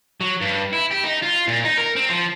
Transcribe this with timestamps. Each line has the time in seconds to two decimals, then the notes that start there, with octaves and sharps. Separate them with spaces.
0.21 F#3
0.41 G2
0.73 E4
0.91 G4
1.04 D#4
1.23 F4
1.48 A#2
1.64 D#4
1.78 A#4
1.96 C4
2.09 F3